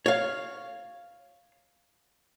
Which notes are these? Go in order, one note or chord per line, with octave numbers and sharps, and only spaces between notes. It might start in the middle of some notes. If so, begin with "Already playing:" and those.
C#5 F5